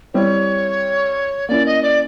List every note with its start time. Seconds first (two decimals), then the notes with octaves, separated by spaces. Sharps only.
0.14 G3 C4 E4 G4 C#5
1.48 A#3 C#4 E4 D5
1.66 D#5
1.83 D5